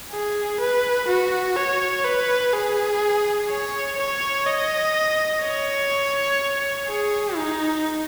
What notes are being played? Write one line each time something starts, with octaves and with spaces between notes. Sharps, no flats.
G#4
B4
F#4
C#5
B4
G#4
C#5
C#5
D#5
C#5
G#4
D#4